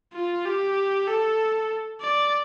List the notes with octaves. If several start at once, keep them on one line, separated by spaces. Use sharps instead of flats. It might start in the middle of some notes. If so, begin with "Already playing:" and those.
F4
G4
A4
D5